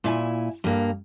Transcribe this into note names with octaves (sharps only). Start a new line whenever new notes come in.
A#2 E4 G#5
G2 A#3